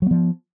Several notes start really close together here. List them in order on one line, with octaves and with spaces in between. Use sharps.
F#3 B3 F3